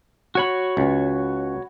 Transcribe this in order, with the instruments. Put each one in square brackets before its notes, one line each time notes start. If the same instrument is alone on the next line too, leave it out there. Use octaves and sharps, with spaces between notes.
[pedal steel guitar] F#4 C#5 B5
[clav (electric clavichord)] C#2